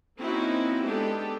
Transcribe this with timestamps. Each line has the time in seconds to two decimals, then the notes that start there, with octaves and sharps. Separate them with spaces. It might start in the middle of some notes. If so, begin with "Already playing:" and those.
0.18 A#3 C4 C#4 D#4 E4 F#4
0.84 G#3 B3 D4 G4 A4